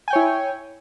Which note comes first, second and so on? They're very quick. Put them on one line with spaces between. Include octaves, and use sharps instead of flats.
G#5 G5 C#5 E4